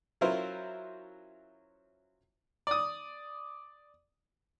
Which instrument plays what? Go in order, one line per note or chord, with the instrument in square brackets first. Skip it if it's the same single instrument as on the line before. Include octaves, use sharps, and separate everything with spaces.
[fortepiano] F#3 C#4 E4 F4 A#4 C5
D5 D#6